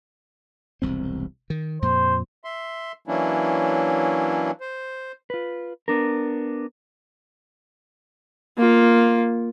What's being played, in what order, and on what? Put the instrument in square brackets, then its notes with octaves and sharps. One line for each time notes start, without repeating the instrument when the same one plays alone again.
[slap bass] E1 C2 C4
D#3
[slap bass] F2 A#2 [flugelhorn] C5
[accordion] E5 C6
E3 F#3 A#3 C#4 D4 E4
C5
[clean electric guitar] F4 B4
B3 D4 A#4
[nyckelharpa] A#3 F4